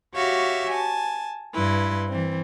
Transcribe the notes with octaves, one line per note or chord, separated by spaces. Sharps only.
F#4 G4 C#5 E5 F5
G#5 A5
G2 E4 B4 C6
E3 C4